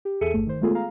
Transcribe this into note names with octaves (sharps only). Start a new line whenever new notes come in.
G4
E2 G#4 A4 E5 C#7 D#7
G1 G2 A3
D#3 C5
G#3 A3 B3 F4 G#4 A4
G#4 F5 A#5